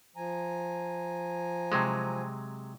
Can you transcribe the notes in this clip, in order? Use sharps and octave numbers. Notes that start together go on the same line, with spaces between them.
F3 G#5 A#5
C3 F#3 G#3